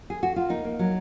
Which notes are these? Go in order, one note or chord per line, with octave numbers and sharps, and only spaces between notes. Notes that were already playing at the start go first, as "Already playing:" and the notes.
G#4
F#4
F4
A#3 D#4
A#3
F#3